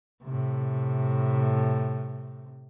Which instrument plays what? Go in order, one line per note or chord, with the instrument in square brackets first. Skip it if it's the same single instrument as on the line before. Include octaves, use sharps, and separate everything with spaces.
[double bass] A2 C3